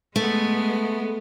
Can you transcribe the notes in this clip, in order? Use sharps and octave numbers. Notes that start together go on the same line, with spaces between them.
G#3 A3 B3